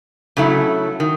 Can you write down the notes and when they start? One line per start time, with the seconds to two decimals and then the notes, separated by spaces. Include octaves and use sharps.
0.37 C#3 F#3 A3 E4
1.00 D#3